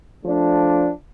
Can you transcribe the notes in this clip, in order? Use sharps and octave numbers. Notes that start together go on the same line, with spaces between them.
F3 A3 D4